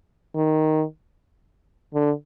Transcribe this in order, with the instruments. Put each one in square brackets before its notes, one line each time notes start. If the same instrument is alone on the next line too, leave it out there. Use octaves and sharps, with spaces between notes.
[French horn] D#3
D3